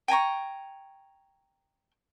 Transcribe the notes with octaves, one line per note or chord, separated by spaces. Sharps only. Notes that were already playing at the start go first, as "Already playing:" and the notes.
G5 G#5 A#5 C#6